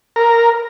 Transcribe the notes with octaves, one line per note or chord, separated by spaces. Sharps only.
A#4